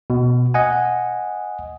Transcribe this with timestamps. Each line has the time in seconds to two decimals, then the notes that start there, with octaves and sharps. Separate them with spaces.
0.10 B2
0.54 D#5 F#5 G#5